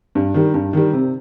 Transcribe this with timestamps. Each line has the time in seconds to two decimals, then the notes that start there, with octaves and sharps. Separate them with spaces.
0.15 G2
0.34 D#3 G3
0.54 G2
0.73 D#3 G3
0.93 C3